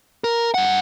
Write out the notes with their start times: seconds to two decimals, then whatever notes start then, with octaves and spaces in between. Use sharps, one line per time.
0.24 A#4
0.54 G2 F#5